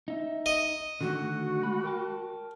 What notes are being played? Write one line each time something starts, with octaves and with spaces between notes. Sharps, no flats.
D#4 E5
D#5
D3 D#3 A3 F#4
G#3 B5
A#4 G5 A5